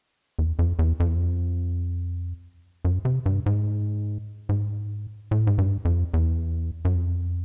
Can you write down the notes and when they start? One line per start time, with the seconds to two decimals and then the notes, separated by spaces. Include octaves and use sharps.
0.39 E2
0.59 F2
0.79 E2
1.00 F2
1.08 E2
1.16 F2
2.85 F#2
3.05 C3
3.26 G2
3.46 G#2
4.49 G#2
5.31 A2
5.47 G#2
5.58 G2
5.85 F2
6.14 E2
6.85 F#2
6.95 F2